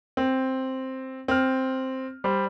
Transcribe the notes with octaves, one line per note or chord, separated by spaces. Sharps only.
C4
C4 F6
G3 C5